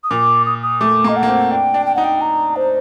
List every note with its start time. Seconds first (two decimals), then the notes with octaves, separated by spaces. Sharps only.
0.04 D#6
0.11 A#2 D6
0.46 D#6
0.62 D#6
0.81 A3 D6
1.04 A#3 D#5
1.16 F#5
1.23 A#3
1.28 C4
1.51 D4 G5
1.74 D4
1.86 G5
1.95 D#4 F#5
2.04 G5
2.21 A#5
2.56 C5